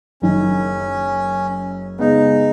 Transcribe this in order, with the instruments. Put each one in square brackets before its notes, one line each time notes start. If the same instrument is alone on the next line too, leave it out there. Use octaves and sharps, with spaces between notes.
[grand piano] F#1 F#2 D#3 [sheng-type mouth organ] C#4
[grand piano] C#3 G#3 B3 [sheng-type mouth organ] D#4